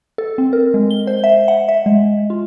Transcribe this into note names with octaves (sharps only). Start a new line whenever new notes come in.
A4
C4
A#4
G#3
G7
C5
E5
F#5
E5
G#3
F4